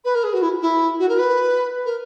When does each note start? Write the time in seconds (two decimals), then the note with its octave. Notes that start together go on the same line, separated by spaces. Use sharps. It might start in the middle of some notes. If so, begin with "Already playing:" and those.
0.04 B4
0.14 A#4
0.23 G#4
0.33 F#4
0.41 E4
0.61 E4
0.99 F#4
1.08 A#4
1.18 B4
1.85 A#4